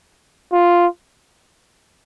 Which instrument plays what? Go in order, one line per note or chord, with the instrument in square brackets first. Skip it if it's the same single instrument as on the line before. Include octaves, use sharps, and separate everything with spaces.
[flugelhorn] F4